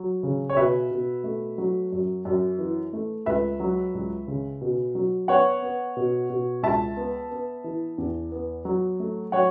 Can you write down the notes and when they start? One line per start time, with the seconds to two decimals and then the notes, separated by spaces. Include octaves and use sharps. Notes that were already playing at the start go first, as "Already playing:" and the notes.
Already playing: F#3
0.23 C#3
0.49 C#5
0.56 B2 B4 E5
0.91 B2
1.24 A3
1.58 F#3
1.92 F#2
2.25 F#2
2.59 E3
2.93 A3
3.26 C#2 B4 E5
3.60 F#3
3.94 C#2
4.27 C#3
4.61 B2
4.95 F#3
5.28 B3 C#5 F#5
5.62 B3
5.97 B2
6.30 B2
6.63 C#2 E5 A5
6.97 B3
7.31 B3
7.64 E3
7.98 E2
8.32 B3
8.65 F#3
9.00 A3
9.32 F#3 C#5 F#5